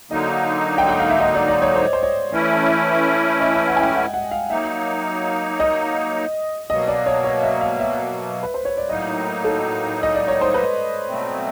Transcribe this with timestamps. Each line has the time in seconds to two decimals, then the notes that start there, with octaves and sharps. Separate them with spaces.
0.11 D3 F#3 A#3 D#4 D#5
0.78 G5
0.89 F#5
0.99 F5
1.10 E5
1.20 D#5
1.35 D5
1.48 D5
1.62 C#5
1.75 C5
1.93 C5
2.03 C#5
2.31 E3 A3 C#4 E4
3.40 D#5
3.54 E5
3.67 F#5
3.77 G#5
3.81 G5
3.95 F#5
4.14 F#5
4.31 F5
4.50 F#3 A#3 D#4 E5
5.60 D#5
6.69 B2 F#3 A#3 D#5
6.88 D5
7.06 C#5
7.24 C#5
7.43 E5
7.61 F5
7.79 E5
8.43 B4
8.54 C5
8.65 C#5
8.77 D5
8.89 A2 F#3 A#3 D#4 D#5
9.44 A4
10.03 D#5
10.15 D5
10.28 C#5
10.41 C5
10.54 B4
11.08 B2 F#3 A3 C4